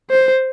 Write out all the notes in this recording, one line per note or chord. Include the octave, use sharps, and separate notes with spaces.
C5